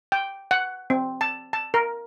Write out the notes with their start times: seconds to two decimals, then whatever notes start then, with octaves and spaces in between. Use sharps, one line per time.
0.12 G5
0.51 F#5
0.90 C4
1.21 A5
1.53 A5
1.74 A#4